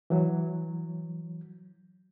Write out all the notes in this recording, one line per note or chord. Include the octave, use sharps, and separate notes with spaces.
E3 F#3